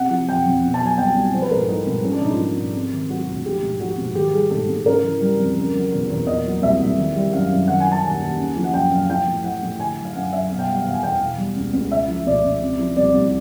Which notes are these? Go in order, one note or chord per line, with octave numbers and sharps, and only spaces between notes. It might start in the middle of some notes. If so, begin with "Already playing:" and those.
Already playing: C3 F#5
F3
F2 G5
F2
B2
A5
F#3 G#5
C2 G5
C2
F3 C5
B4
G#2 A#4
A4
F3 D#4
G#2
F3 C#4
D4
G#2 D#4
F4
F3
G#2
C3
D#3
F#3 F#4
D2
F3 G4
G#2
F3 F#4
G#2
D#3 G4
G3 G#4
G#2 A4
G#2
C#3 A#4
E3
G3
F2
C#3
F#3
E2
E2
A#2 D#5
F#3
C2 E5
C2
D#3
G3
F#2 F5
F#2
D#3 F#5
G#5
F#3
A5
D#2 G#5
D#2
C#3
F3
F#5
F#2 G5
F#2 F5
F3 G5
A2
F3 F#5
A2
D3 G#5
F#3
F5
F#2 F#5
F#2 E5
B2 F5
G5
G3 F#5
F5
E2 F#5
G#5
E2 G5
F5
B2
G3
C#2
C#2
C#3 E5
F3
C#2 D5
C#2
C3
F3
C2 D5
C2